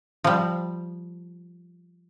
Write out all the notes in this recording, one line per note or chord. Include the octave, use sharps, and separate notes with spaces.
F3 G3